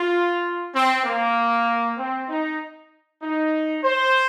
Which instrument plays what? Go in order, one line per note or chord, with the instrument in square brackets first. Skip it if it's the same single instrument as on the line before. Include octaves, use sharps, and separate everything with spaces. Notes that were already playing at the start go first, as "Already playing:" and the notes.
Already playing: [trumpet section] F4
C4
A#3
C4
D#4
D#4
C5